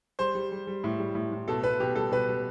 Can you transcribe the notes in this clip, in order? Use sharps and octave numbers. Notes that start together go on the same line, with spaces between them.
G3 C5
G3
G3
G3
A2
G3
A2
A2
B2 A4
B2 B4
B2 G4
G3 A4
B2 B4
G3